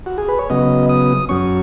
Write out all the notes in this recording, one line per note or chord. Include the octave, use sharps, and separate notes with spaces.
F#4
G#4
B4
C#5
C#3 F#3 B3 D#5
D#6
F#2 F#3 C#4 C#6